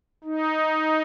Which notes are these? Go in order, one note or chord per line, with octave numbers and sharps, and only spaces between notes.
D#4